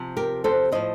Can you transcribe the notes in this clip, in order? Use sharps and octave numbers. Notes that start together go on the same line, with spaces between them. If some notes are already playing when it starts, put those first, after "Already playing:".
Already playing: C3 F3
G4 A#4
A4 C5
A2 F3 C5 D#5